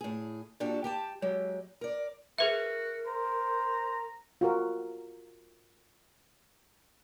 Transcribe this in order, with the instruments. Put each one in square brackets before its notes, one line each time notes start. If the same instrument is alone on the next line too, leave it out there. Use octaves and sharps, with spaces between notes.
[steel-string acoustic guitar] A2 G#4
A#2 D4 F#4 G4 A4
G4 G5 A5
F#3 G#3 G4
A#4 D5
[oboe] F#4 [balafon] G#4 B4 E5 [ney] A#4
[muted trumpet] C5 [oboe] A#5
[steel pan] F4 F#4 A#4